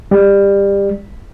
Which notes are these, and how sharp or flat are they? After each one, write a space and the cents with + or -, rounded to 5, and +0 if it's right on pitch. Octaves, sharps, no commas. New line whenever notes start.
G3 +20